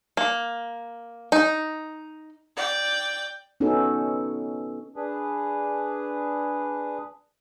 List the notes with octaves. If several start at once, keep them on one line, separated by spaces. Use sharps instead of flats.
A#3
D#4
D5 G5
B3 C#4 D#4 F#4 A4
D4 G#4 B4